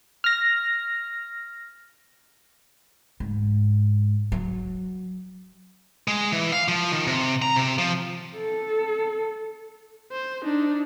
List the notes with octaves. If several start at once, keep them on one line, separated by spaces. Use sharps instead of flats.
F6 A#6
G#2
F#3
G#3
E3
F5
F3
D#3
C3
A#5
C3
F3
A4
C5
D4 D#4